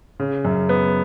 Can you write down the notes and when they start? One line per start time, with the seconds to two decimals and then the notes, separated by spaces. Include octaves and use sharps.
0.20 C#3
0.45 F#2
0.69 B3